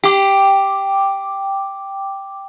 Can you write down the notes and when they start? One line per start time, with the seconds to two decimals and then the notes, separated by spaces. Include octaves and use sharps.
0.04 G4 G5 D6